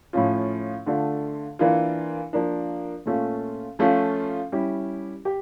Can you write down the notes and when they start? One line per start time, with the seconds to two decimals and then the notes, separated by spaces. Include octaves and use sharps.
0.13 A2 F3 C#4 F4
0.86 D3 A3 D4 F4
1.59 E3 A#3 D4 F4
2.33 F3 A#3 D4
3.06 A#2 A3 C#4 F4
3.79 F3 A3 C#4 F4
4.52 G3 C#4 E4 G4
5.25 G4